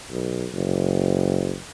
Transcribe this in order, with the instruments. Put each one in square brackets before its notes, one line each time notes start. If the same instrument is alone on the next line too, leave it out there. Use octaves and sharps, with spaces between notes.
[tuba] B1
F#1